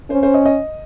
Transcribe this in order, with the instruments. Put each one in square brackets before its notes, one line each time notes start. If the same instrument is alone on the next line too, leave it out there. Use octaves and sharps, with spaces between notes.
[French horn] C#4 [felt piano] C5
[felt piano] C5
D#5
D#5